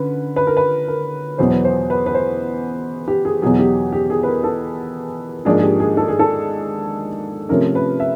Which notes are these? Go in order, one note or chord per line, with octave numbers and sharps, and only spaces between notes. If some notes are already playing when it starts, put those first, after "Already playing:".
Already playing: D3 C#4 B4
B4
A#4
B4
A#4
E2 B2 F#3 B3 C5
B4
C5
B4
B4
C5
G4
G#4
E2 B2 F#3 G#4
G4
G4
G#4
B4
A#4
A4
G#2 F3 A#3 D4 G#4
G#4
G4
G#4
A4
G#4
A4
C3 F3 A3 C#4 A#4
B4
E5